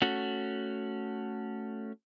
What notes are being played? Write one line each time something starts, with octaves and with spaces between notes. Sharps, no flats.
A3 C#4 F#4